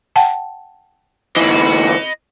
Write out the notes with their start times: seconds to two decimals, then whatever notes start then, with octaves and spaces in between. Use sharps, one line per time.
0.16 F#5 G5 A5
1.37 D2 E3 D#5 B5